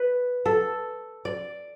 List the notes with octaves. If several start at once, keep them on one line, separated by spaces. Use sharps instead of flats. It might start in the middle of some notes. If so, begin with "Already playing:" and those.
Already playing: B4
A4
D5